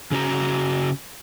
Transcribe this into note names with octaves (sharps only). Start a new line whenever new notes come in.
C#3 C#4 F#4 A#5